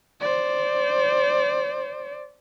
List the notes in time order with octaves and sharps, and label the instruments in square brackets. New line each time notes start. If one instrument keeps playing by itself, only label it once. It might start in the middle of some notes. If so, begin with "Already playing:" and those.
[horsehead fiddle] C5 D5